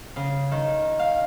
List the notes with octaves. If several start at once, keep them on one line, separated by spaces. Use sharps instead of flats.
C#3
D#3
F5